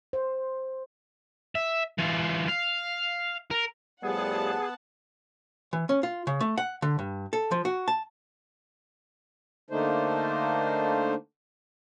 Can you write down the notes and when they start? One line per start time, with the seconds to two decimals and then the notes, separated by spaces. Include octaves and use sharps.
0.13 C5
1.55 E5
1.98 E3 F4
2.48 F5
3.51 A#4
4.03 A2 F3 G3 B3 G#4 F#5 A5
5.73 E3
5.89 C#4
6.03 F4
6.27 C#3
6.41 A3
6.58 F#5
6.82 D3
6.99 G2
7.33 A4
7.51 F3
7.65 F#4
7.88 A5
9.70 D3 A3 A#3 D4 D#4 C5